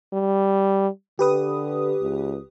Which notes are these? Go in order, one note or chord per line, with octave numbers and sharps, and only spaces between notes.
G3
D3 G4 B4 D#6
C#2